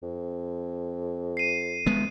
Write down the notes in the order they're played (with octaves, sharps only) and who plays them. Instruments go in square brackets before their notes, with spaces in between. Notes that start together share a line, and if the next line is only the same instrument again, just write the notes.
[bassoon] F2
[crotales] C7 D#7
[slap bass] G#3 B3